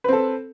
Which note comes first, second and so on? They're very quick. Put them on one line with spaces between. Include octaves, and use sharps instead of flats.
B4 C4 A4